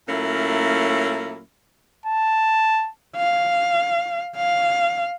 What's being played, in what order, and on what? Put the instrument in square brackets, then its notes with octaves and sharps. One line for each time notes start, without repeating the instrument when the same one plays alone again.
[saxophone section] A#2 F#3 A3 A#3 C#4 E4
[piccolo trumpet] A5
[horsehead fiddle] F5
F5